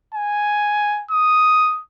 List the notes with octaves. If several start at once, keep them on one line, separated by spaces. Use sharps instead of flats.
G#5
D#6